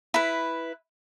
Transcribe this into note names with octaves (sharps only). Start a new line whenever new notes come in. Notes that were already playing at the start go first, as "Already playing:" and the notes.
E4 B4